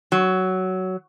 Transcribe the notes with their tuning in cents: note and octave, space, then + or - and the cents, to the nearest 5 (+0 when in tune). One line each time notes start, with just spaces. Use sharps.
F#3 +10